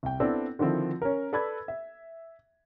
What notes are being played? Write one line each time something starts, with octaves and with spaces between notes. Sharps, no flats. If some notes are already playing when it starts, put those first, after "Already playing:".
C2 G5
B3 C4 D4 E4 A4 D5
D3 D#3 F3 C4 E4
C#4 A#4
A4 B4 D5 B5 E6 G#6
E5